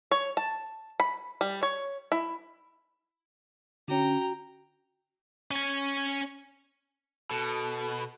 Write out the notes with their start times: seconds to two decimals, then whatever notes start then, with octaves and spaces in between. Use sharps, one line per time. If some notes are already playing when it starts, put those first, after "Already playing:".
0.11 C#5
0.37 A5
1.00 B5
1.41 G3
1.63 C#5
2.12 E4
3.88 D3 C#4 F#4 G5 A#5
5.51 C#4 G#5
7.31 B2 A4